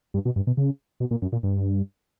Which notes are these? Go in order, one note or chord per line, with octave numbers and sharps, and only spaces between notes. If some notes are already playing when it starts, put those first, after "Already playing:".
G2
B2
G2
B2
C#3
B2
A#2
F#2
A#2
G2